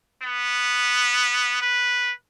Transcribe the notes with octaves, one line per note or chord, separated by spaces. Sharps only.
B3
B4